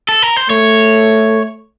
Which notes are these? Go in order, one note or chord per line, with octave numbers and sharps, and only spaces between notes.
A4
A#4
C5
A3 C#5